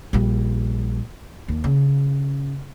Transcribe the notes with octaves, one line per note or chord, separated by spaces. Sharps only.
A#1 G3
D#2
C#3